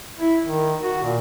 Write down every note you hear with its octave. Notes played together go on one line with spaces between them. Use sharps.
E4
D#3
F#4
A#2